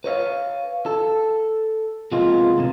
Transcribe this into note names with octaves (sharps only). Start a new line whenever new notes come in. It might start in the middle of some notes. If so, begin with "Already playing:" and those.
B4 C#5 E5 F5
A4
C3 F3 G#3 A#3 B3 F4
D2 C3